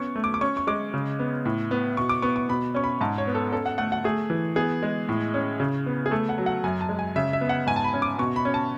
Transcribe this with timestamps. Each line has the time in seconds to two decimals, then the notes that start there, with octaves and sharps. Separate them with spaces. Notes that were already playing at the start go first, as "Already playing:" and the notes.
Already playing: B3 C#4 C#6
0.16 A3
0.24 D6
0.34 D6
0.41 C#4 C#6
0.57 C#6
0.67 G#3 D6
0.94 C#3
1.19 B3
1.45 A2
1.71 B3
1.97 B2 C#6
2.09 D6
2.22 B3 C#6
2.36 C#6
2.49 B2 B5
2.74 C#4 C#6
2.84 B5
3.01 G#2 A5
3.18 C#5
3.27 B3
3.35 A4
3.52 C#4 A4
3.66 F#5
3.78 A3 F#5
3.92 F#5
4.04 A3 G#4
4.30 E3
4.56 B3 G#4
4.83 G#3
5.09 A2
5.34 C#4
5.60 C#3
5.86 B3
6.06 G#4
6.11 A3 A4
6.29 F#5
6.38 F#3
6.46 F#5
6.64 F#2 G#5
6.81 A5
6.89 G#3
6.99 G#5
7.16 C#3 E5
7.33 E5
7.41 B3
7.49 F#5
7.67 G#2 G#5
7.76 A5
7.84 B5
7.94 C#4
8.02 D6
8.18 B2 C#6
8.36 B5
8.45 C#4
8.54 A5